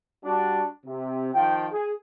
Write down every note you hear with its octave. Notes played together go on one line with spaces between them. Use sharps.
G3 D4 F#4
C3
D#3 F3 F4 G5
G#4